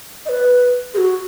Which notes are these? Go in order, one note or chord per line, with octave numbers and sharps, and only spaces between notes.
D#5
B4
G#4
F#4